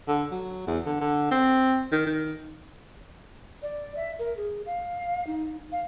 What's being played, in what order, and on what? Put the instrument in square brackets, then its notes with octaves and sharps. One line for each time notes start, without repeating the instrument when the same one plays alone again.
[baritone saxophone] D3
F#3
E2
D3
D3
C4
D#3
D#3
[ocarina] D5
E5
A#4
G#4
F5
D#4
F5